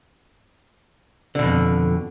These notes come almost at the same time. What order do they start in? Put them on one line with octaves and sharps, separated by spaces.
D3 B2 F2